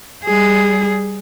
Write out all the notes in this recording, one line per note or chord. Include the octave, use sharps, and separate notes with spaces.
G3 G#4